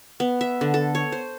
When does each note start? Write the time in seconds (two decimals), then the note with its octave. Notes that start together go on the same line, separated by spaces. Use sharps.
0.20 B3
0.41 E5
0.61 D3
0.74 A4
0.95 C#5
1.12 C5